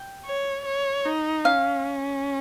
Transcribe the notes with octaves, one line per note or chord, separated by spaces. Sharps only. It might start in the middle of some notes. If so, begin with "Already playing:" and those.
Already playing: G5
C#5
C#5
D#4
C#4 F5